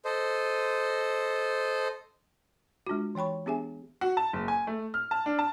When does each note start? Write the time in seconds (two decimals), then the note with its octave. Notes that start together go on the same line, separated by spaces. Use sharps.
0.05 A4 C5 D#5
2.87 G#3 D4 F4 F#4
3.15 E3 C#5 G5 B5 C#6
3.46 B3 D4 G4 G#4 E5 G#5
4.01 F#4
4.17 A5
4.33 F#1
4.48 G#5
4.67 A3
4.94 F6
5.11 A5
5.26 D4
5.39 A5